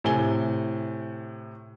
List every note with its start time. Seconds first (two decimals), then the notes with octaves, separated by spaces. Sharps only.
0.04 A2 C3 G#5 G7